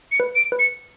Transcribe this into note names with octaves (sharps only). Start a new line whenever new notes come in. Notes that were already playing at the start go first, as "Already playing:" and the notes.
C#7
B4
D7
B4
C#7